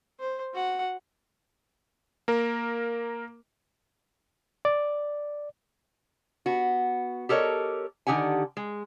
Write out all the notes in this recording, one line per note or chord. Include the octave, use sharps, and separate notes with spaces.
C5
F#4 F#5
A#3 A#4
D5
B3 F#4
G4 A4 A#4 C#5 D#5
D3 D#3 G4 F#5 G#5
G#3